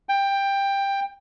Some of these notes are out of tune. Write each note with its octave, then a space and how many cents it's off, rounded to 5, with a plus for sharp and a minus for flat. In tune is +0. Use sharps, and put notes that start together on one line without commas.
G5 +15